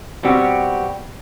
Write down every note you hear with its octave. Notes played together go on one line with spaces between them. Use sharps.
B2 G3 C4 F#4 G4